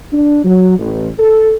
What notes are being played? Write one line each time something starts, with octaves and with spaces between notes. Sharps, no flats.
D4
F#3
A1
A4